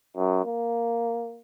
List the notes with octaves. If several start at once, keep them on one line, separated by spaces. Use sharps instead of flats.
F#2
A#3